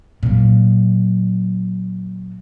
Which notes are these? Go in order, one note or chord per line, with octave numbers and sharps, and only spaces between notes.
A#2 F#3